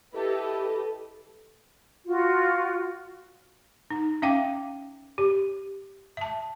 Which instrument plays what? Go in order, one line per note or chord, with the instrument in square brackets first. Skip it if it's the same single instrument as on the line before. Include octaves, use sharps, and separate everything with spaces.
[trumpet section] E4 [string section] G4 B4 D#5 [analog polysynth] A4
[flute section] F4 F#4
[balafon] D#4
C#4 E5 F5 G5 D6
G4
E5 A5